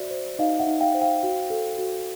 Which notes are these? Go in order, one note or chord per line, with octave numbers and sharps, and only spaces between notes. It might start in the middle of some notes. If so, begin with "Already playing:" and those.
Already playing: F#4 C5 D5 E5
C5
D#4 D#5 F5
E5 F#5
D#4
F5 G5
C5
F5 G5
F#4
A4
F#4